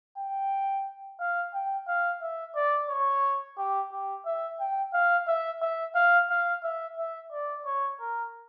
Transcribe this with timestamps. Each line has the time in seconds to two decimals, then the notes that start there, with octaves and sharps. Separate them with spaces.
0.18 G5
1.20 F5
1.53 G5
1.88 F5
2.22 E5
2.56 D5
2.89 C#5
3.58 G4
3.92 G4
4.26 E5
4.60 G5
4.94 F5
5.28 E5
5.62 E5
5.95 F5
6.30 F5
6.64 E5
6.98 E5
7.32 D5
7.66 C#5
8.00 A#4